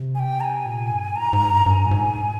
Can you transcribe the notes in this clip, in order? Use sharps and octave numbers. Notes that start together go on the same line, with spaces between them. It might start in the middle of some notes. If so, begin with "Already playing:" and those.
Already playing: C3
G#5
G5
A#5
G#5
A#2
G2
G#2 A#5
G#2
G2
G2 G#5 A#5
A#2
G#2